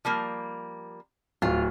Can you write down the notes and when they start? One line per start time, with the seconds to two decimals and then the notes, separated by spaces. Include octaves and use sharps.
0.05 F3 G3 A#3
1.42 D1 F4